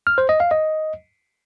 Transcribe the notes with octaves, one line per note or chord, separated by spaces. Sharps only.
F6
C5
D#5
F5
D#5